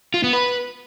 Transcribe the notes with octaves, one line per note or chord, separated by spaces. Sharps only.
F4
B3
B4